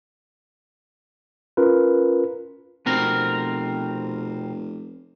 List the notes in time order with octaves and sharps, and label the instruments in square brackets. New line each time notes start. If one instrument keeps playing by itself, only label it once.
[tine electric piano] C#4 F4 A#4 B4
[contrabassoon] F1 [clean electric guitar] B2 C4 A#4